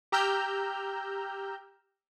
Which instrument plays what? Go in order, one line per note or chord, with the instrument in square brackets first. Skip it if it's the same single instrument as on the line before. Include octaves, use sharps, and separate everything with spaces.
[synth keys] G4 A#5 E6 F6 G6